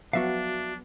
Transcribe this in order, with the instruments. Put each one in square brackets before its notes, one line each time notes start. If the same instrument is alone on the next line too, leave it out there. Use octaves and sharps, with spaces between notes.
[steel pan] F3 F#3 B3 [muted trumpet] D4 [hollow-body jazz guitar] F#4 E5 F5